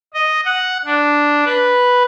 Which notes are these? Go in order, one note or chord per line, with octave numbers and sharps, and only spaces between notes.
D#5
F#5
D4
B4